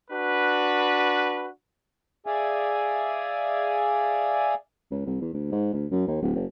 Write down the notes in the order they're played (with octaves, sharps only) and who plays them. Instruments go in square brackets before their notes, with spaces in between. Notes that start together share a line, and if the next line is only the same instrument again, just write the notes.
[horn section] D4 F#4 B4
[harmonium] G#4 D5 E5 F5 G#5
[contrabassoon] C#2
C2
E2
D2
G#2
D2
F#2
D#2
D1
F#1